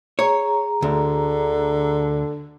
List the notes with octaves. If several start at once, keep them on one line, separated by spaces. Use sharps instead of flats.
G#4 C#5 A#5
D2 D3